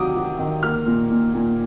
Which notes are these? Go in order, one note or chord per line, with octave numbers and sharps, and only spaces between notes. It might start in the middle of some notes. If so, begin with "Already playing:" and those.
Already playing: C3 D#3 F#3 D6 D#6
F#3
D#3
A#3 F6
A#2
A#2
A#2